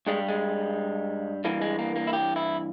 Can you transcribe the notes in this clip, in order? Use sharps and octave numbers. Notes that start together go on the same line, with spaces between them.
G2 G3 G#3
G#3
G2 E3 G3 A#3
G#3
A#3
A#3
E4
G4
E4